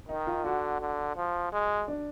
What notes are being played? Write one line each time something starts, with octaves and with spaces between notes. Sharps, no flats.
D#3 D#4
F4
D3 F#4
D3
F3
G#3
D4